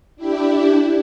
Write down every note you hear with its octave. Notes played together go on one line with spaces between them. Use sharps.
D4 E4 G4